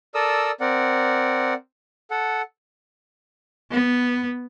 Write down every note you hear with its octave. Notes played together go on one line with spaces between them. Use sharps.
A4 A#4 D5 D#6 E6
C4 A#4 D5 F#5
A4 F#5
B3